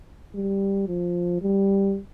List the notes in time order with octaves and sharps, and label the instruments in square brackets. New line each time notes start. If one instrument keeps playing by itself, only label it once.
[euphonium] G3
F3
G3